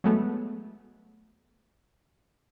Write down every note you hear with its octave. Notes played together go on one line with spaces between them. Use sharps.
F#3 G#3 A3 B3